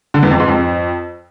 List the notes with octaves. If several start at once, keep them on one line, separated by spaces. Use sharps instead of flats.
D3
E2
F2
G#2
F2